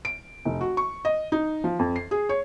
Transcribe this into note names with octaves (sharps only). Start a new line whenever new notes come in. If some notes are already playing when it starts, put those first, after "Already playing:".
D7
F1
F#4
C#6
D#5
D#4
F3
F2
C7
G#4
C#5